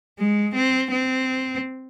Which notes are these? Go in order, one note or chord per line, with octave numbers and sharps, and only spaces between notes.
G#3
C4
C4